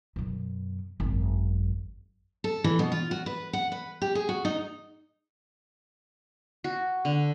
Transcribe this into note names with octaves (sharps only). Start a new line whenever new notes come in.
F#2 B2
G#1 F#2
A4
E3
B2
F4
F#4
B4
F#5
B4
G4
G#4
F#4
D#4
F#4
D3